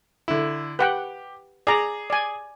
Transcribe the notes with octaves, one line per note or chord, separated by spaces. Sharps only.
D3 E4
G4 B4 F#5 G5
G#4 D5 A#5
D5 G#5